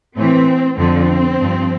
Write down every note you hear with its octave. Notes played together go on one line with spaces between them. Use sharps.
A2 E3 C4
F2 D3 F3 C4
G2 F3